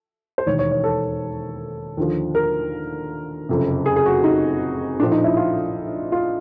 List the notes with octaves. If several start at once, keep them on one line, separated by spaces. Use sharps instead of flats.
C5
E1 D#2 D#3 C#5
C#5
C#5
A4
D#2 D3 F3
A#4
F#1 F2 C3
G#4
G#4
F#4
D#4
A#1 A2 F3 D4
D#4
E4
F4
F4